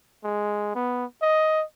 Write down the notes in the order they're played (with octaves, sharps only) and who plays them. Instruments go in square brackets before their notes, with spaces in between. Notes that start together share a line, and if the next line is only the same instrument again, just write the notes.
[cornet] G#3
B3
D#5